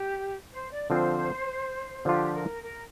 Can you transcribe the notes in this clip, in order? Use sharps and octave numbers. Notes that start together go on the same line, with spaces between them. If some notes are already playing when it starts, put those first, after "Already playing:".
Already playing: G4
C5
D5
D3 F3 C4 F4 C5
D3 F3 D4 F4 G4
A#4
A#4